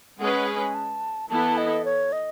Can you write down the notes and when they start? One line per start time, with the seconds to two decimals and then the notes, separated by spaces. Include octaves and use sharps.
0.19 G#3 C#4 G#4 B4 F#5
0.47 G#5
0.74 A5
1.29 E3 B3 E4 A4 A5
1.57 D#5
1.85 C#5
2.12 D#5